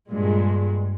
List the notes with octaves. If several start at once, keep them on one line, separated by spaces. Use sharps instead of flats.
G2 A#2 G#3